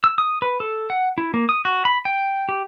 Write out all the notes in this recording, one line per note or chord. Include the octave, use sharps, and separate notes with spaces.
E6
D#6
B4
A4
F#5
E4
A#3
D#6
F#4
B5
G5
G4